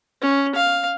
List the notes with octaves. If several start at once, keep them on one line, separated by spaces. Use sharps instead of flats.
C#4
F5